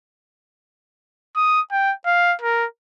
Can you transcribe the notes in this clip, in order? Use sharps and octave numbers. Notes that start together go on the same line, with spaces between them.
D#6
G5
F5
A#4